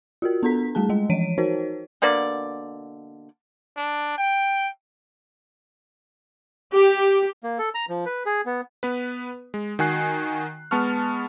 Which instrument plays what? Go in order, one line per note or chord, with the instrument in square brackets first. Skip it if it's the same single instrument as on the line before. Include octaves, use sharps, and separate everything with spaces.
[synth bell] F4 F#4 A#4
B3 D4 A4 A#5 B6
G3 A3 G#4 A5
G#3 D#5
E3 F3 C#5 D7 D#7
D#4 F#4 A#4 C5 C#5
[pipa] B2 D3 A#3 D5
[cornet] D4
G5
[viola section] G4
[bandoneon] A#3
A4
A#5
F3
B4
G#4
B3
[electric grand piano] B3 B4
G#3
D#3 F#4 G#5 F#6 C7
G#3 B3 A5 C#6 F6